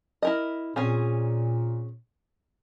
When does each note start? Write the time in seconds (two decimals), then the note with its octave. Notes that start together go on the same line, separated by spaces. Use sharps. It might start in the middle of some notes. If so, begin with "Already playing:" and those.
0.22 E4 A#4 D#5
0.76 A#2 C4 C#4 G#4